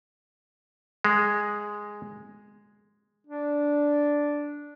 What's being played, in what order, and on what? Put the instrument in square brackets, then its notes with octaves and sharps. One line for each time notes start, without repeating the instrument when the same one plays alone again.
[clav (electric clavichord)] G#3
[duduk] D4